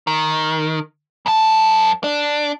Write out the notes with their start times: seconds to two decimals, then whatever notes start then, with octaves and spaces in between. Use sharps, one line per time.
0.07 D#3
1.26 F#2 A5
2.04 D4